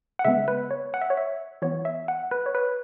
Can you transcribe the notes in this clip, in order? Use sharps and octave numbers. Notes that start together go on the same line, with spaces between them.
F#5
C#3 G#3 B3 E5
B4
C#5
F#5
E5
C#5
E5
E3 B3 C#5
E5
F#5
B4
C#5
B4